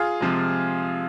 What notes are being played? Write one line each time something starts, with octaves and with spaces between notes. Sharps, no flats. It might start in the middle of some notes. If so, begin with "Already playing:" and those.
Already playing: F4 G#4
C3 F3 G#3